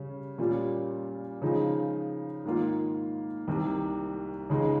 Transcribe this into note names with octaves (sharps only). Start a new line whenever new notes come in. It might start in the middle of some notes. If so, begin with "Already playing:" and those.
Already playing: C#3 G3 C#4
A#2 G3 C#4 F4
C#3 F3 G#3 D#4
G#2 D#3 A#3 F4
C2 C3 D#3
C#2 C#3 G#3 D#4